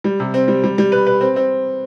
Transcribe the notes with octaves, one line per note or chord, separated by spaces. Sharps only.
G3
C3
C4
G3
G3
G3
B4
B4
C4
C4